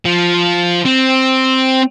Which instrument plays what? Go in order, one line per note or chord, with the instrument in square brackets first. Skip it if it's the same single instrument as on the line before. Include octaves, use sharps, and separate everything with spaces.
[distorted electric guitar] F3
C4